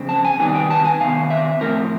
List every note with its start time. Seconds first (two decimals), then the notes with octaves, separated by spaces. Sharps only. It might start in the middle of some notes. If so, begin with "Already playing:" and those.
Already playing: F2 C#3 C4
0.09 A5
0.25 G#5
0.39 C3 D#3 G3 B3 G#5
0.55 G5
0.70 A5
0.85 G#5
1.01 C3 D#3 B3 F5
1.30 E5
1.61 A2 F3 A3 C4 A#4